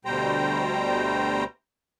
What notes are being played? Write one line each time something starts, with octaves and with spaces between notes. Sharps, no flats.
D2 B2 G3 C5 G5 A#5